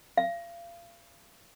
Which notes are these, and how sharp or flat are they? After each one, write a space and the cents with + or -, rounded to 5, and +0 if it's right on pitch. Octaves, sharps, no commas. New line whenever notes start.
F5 -35